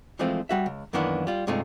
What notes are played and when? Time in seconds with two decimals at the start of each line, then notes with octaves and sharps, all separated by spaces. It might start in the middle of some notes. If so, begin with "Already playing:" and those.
0.19 E3 F3 G#3 A3 C4 F4
0.49 G3 F#4 E5
0.66 C#2
0.93 F#2 D#3 E3 A#3 B3 D4
1.27 G3 F4
1.47 G2 C3 G#3 A3 D#4 F4